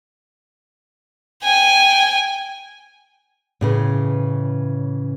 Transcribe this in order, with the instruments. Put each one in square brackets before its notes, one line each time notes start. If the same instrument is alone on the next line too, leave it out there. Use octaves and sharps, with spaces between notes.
[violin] G5 G#5
[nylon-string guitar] A2 C#3 E3